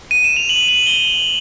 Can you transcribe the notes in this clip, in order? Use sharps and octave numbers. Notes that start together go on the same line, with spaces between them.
D#7
E7
F7
F#7
F#7
G7